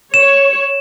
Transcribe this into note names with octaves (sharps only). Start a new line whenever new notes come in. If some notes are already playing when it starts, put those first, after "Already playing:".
C#5 E7